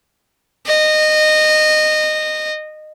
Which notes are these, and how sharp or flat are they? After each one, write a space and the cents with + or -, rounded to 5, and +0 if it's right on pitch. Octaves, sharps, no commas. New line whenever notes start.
D#5 -20